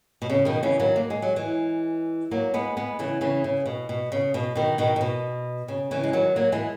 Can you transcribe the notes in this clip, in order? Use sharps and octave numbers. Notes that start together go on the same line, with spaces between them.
B2
C#3
B2 D#3
C#3 E3
D#3 F#3
A#3
G#3
F#3
E3 G#3
F#3 A#3
G#3 B3
G#3 B3
C#3 E3
C#3 E3
C#3
B2
B2
C#3
B2
B2 D#3
B2 D#3
C#3
B2
C#3
C#3 E3
G#3
D#3 F#3
F#3 A#3
E3 G#3